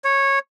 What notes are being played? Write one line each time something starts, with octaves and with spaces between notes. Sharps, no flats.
C#5